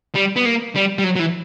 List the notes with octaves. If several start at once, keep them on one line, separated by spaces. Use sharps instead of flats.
G3
B3
A#3
G3
G3
F#3
F#3
E3